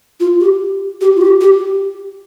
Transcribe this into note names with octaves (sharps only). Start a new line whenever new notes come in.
F4
G4
G4
F4
G4
G4